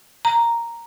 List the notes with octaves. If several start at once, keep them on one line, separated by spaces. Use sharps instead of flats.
A#5